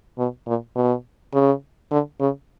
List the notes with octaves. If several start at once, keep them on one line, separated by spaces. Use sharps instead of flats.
B2
A#2
B2
C#3
D3
C#3